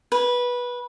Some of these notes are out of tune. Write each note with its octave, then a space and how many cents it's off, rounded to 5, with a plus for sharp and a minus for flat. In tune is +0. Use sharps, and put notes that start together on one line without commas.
B4 -15